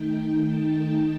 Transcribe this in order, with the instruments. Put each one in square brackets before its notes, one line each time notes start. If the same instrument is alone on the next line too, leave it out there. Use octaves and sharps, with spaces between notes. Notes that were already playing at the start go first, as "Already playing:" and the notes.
Already playing: [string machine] D#3 A3 D#4 G5
G5
A5
A5